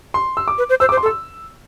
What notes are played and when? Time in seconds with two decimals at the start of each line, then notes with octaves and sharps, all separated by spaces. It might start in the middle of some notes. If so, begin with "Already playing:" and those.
0.14 C6
0.37 E6
0.48 D6
0.58 B4
0.69 C5
0.80 C5 E6
0.89 D6
0.92 C5
0.97 C6
1.03 A4
1.06 E6